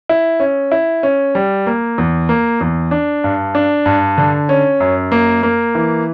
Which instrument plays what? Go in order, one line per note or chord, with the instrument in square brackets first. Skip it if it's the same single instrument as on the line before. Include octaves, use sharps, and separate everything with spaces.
[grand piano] E4
C#4
E4
C#4
G3
A#3
E2
A#3
E2
D4
G2
D4
G2
D3
C#4
F#2
A#3
A#3
E3